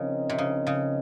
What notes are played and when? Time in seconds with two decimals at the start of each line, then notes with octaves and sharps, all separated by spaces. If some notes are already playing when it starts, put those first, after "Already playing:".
Already playing: C#3 F3 C4 D#4 A#4 D#5
0.30 C3
0.38 C#3
0.67 C#3